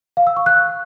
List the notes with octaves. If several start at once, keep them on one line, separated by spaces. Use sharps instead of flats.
F5
E6
C#6
F#6